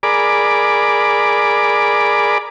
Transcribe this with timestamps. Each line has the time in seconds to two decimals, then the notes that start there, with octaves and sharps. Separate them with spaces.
0.03 G#4 A#4 D5 B5 D6